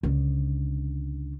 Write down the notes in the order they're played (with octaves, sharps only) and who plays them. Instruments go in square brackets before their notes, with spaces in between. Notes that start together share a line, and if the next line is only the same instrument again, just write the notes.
[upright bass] C#2 D3